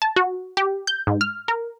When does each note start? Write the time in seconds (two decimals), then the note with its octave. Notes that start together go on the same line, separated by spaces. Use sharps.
0.02 A5
0.16 F#4
0.57 G4
0.87 G6
1.07 G#2
1.21 F6
1.48 A#4